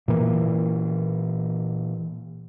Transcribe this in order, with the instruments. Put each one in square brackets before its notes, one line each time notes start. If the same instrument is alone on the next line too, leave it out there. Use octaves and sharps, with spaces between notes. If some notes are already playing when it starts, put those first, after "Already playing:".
[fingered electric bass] A#2 E3 A#3